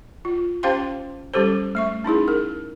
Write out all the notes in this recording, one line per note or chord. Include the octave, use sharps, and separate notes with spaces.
F4
C#4 G4 C5 F5 G5 C6
G3 C#4 G4 A4 C5
A3 E5 C#6
C#4 D#4 E4 G#4
G#4 A#4